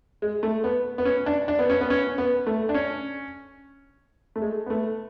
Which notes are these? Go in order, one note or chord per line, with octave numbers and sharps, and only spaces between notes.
G#3
A3
B3
B3
C#4
D4
D4
B3
C#4
B3
C#4
B3
A3
D4
C#4
A3
G#3
B3
A3